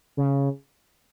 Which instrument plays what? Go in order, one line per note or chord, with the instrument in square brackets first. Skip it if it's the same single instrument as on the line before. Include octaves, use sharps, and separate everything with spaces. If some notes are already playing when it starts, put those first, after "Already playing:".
[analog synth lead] C#3